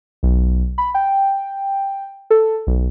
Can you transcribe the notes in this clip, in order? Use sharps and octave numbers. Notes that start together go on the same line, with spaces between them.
B1
B5
G5
A4
B1